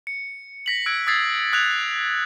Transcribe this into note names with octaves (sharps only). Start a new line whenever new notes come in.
C#7
A#6 B6 F#7
E6 F#6 G#6 D7
D#6 E6 G#6 A6 B6 C7
D#6 F#6 G#6 F7